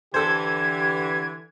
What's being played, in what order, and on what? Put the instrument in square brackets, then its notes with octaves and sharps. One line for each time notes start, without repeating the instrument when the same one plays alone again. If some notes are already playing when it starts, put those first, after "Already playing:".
[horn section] D3 E3 [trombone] G4 [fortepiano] A4 C5 [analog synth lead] G#6